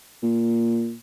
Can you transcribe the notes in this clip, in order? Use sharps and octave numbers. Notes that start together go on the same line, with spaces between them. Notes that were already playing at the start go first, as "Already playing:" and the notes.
A#2